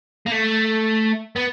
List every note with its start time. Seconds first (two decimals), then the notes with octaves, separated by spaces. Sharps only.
0.26 A#3
0.31 A3
1.36 B3